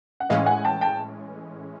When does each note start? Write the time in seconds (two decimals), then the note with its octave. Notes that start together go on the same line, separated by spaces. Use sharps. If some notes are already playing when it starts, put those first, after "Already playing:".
0.20 F#5
0.29 A2 E3 G#3 C#4 D#5 F5
0.46 F#5 G#5
0.64 G5 A5
0.81 G5 A5